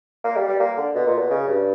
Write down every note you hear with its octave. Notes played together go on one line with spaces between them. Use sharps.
A#3
G3
G3
A#3
D3
B2
A#2
B2
C#3
G2